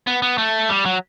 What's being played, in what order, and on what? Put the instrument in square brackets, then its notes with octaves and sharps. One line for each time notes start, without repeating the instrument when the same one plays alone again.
[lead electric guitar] B3
B3
A3
G3
F#3